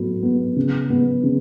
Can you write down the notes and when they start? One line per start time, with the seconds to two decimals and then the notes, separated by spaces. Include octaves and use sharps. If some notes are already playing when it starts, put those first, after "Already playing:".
Already playing: A2 F#3 B3
0.23 B3
0.56 C#3
0.90 B3
1.23 C#3